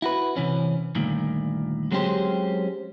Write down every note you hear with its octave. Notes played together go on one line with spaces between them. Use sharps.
E4 F#4 B4
C3 E3 C#4
D2 G2 A#2 D#3
F#3 G#3 C4 C#4 G4 C5